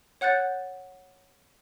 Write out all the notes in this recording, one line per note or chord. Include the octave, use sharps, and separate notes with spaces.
C#5 F#5 F#6 G6 A6